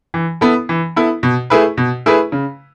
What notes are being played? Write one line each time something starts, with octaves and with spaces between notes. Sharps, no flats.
E3
B3 E4 A4
E3
B3 E4 A4
B2
A3 E4 G#4 B4
B2
A3 E4 G#4 B4
C#3